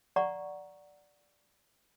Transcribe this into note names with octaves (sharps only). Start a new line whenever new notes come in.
D5 F#5 A#5 C#6